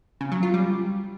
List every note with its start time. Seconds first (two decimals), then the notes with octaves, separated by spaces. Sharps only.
0.21 C#3
0.32 F#3
0.43 F4
0.54 G3